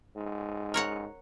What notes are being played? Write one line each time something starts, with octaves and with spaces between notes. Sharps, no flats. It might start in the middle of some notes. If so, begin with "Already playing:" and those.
G#2
A#4 C#5 F#5